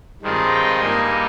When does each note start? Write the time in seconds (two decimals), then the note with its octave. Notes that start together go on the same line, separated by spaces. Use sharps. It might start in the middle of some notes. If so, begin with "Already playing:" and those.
0.22 G2 D#3 G#3 C4 F4
0.51 G5
0.80 G2 G3 A#3 D#4 G#5